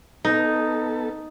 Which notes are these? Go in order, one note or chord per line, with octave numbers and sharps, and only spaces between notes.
B3 D#4 A4